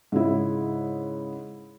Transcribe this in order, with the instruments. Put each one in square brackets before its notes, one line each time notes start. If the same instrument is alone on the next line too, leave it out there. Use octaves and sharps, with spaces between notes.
[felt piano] G#2 C#3 E4